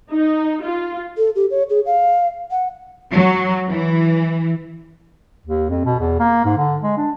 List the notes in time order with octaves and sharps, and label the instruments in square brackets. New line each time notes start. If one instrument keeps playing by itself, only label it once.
[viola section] D#4
F4
[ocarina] A4
G4
C#5
G#4
F5
F#5
[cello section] F#3
E3
[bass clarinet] D#2
F2
B2
E2
A#3
G#2
D3
G#3
D4